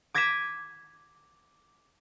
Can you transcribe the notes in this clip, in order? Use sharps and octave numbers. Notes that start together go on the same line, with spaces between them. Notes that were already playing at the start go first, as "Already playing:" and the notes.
D6 G#6 A#6 B6 D#7 E7